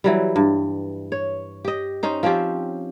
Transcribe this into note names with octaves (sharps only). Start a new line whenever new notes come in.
E3 F#3 G3
G2
C#5
G4 D#5
C#4 D#4 C5
F3 C4 C#4 G4